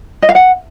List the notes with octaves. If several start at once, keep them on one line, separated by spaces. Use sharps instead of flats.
D#5
F5
F#5